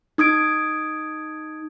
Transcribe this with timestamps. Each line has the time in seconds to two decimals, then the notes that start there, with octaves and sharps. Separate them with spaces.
0.18 D#4 D#6 G#6 D7